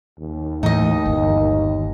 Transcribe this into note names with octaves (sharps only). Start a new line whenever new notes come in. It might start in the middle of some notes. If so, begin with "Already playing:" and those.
D#2
A2 E3 D#4 D#5
G1